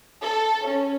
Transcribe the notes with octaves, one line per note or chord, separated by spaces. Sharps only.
A4
C#4